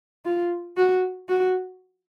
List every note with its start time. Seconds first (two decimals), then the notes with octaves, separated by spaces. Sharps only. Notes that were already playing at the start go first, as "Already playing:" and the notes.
0.25 F4
0.77 F#4
1.29 F#4